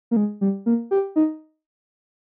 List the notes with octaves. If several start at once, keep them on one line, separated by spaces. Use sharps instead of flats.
A#3
G#3
G3
A#3
G4
D#4